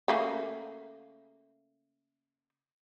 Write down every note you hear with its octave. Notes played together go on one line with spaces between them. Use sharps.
C#3 A3 A#3